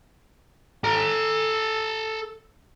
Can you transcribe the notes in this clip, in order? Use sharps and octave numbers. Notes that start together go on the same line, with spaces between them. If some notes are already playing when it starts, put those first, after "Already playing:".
A4 A#5